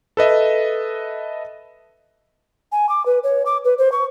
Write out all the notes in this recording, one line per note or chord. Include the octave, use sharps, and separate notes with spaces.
A4 B4 D#5 E5
G#5
D6
B4
C#5
D6
B4
C5
C#6